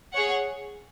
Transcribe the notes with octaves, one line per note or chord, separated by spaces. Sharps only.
G#4 C#5 F#5